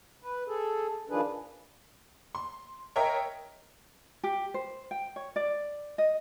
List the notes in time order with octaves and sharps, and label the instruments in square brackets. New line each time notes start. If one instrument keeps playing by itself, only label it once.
[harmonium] B4
G#4 A4
D#3 F3 D4 G#4 B4
[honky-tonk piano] C6
A#4 C#5 D#5 E5 G5 A#5
[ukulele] G4
C5
G5
C#5
D5
D#5